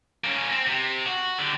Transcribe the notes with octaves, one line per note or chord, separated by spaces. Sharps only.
A#3 C#4
C4
C3
F#4
D3 G4